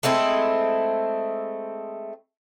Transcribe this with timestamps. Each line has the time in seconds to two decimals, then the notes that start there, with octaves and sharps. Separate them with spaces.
0.03 G#3 A3 C4 E4